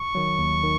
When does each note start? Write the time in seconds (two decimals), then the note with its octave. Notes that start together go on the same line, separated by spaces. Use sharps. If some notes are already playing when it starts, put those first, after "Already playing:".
Already playing: C#6
0.15 D#3 F#3
0.39 D#2
0.63 D#3